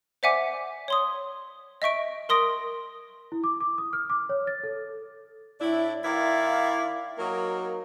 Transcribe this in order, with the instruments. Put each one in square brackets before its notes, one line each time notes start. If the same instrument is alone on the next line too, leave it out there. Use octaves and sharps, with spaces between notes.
[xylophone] C5 D5 E5 F#5 G#5 D6
C#5 C6 D#6
D#5 E5 C#6 D7
A#4 C6 D#6 A#6 D7
[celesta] E4
D6
D6
D#6
F6
D6
C#5
A6
A4
[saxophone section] A2 D4 E4
D#3 E4 D5 F5
F#3 A#3 D#4 F#4 A#4